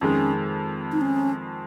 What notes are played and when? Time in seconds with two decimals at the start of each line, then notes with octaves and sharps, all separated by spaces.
0.01 F2 D#3 G#3 C#4
0.92 D#4
1.01 C#4